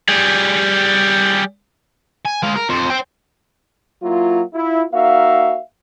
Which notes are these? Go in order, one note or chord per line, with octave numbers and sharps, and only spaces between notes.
G3 G#4
G#5
G#3 F5
A#4
F2 C5
C5 G5
F#3 A#3 E4 F4
E4 F4
A#3 D#4 F#4 E5 F5